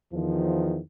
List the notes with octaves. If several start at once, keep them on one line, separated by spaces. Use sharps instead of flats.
E2 D#3 F3